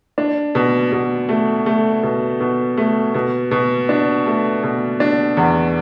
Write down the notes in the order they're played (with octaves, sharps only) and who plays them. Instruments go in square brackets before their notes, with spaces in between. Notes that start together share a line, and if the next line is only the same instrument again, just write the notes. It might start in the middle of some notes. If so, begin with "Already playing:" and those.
[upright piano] D4
B2
B2
A3
A3
B2
B2
A3
B2
B2
D4
A3
B2
D4
E2